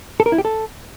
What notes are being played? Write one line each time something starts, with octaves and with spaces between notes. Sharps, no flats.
A4
A#4
E4
G4
A4